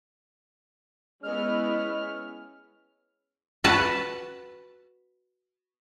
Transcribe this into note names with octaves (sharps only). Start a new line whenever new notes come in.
G#3 B3 C#4 E4 D#5 F6
F#4 B4 A5